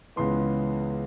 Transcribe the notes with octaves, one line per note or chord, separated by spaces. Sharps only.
C#2 C#3 E3 G#3 B3 C6